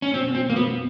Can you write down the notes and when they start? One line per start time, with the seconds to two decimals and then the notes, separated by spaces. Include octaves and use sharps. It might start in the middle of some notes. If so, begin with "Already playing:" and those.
0.02 C#4
0.14 B2 C4
0.35 B2 C4
0.50 A#3
0.56 B2 B3